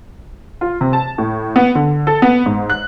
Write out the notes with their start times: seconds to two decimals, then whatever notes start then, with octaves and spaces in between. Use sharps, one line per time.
0.61 F4
0.81 C3
0.93 A5
1.18 A2
1.56 B3
1.75 D3
2.07 A4
2.22 B3
2.46 G#2
2.70 F#6